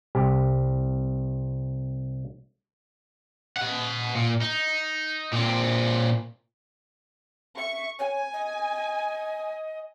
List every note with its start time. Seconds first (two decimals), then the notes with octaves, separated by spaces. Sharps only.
0.15 C2 G4
3.57 D#5 F#5
4.15 A#2
4.41 D#4
5.33 A#2 C4
7.58 E5 C#6
7.99 C#5 G#5
8.33 D#5